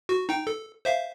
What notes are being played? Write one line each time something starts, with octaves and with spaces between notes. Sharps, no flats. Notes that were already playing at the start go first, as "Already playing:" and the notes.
F#4
D#4 G5
A4
C5 E5 F5